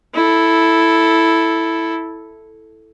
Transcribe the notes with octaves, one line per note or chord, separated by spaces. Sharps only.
E4 A4